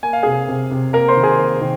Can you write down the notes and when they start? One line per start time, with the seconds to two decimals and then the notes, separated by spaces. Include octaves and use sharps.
0.03 A#3 G#5
0.13 F5
0.23 C3 G#4 G#5
0.48 C3
0.71 C3
0.93 A#3 A#4 A#5
1.08 C5 C6
1.16 D#3
1.23 G#4 G#5
1.39 A#3
1.61 D#3